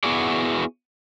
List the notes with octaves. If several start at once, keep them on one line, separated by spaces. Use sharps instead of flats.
B3 E4 F#4 G#4 D5